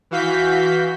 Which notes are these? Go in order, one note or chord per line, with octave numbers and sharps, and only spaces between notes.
E3 F#4 F5 G6 B6